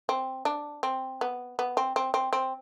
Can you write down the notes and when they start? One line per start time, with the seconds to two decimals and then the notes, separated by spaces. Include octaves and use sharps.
0.09 C4
0.45 D4
0.83 C4
1.21 B3
1.59 B3
1.77 C4
1.96 C4
2.14 C4
2.33 C4